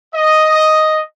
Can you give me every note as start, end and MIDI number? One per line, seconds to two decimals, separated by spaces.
0.15 1.01 75